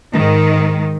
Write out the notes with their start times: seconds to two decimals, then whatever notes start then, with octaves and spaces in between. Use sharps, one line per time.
0.15 G#2 D#3